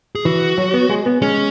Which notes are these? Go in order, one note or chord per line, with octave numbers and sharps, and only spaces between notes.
G#4
E3 F#4
F#3
B3
G#3
B3
G#3 C#4